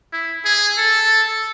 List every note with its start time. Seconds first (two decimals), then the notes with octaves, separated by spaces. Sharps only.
0.13 E4
0.45 G#4
0.78 A4